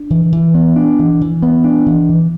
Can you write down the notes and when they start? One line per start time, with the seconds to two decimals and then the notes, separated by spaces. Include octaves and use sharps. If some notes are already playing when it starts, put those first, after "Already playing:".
Already playing: D4
0.10 E3
0.32 E3
0.54 B3
0.76 D4
0.99 E3
1.21 E3
1.43 B3
1.64 D4
1.86 E3
2.09 E3